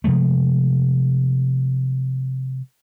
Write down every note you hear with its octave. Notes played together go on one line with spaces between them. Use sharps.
C3 F3 G#3 A3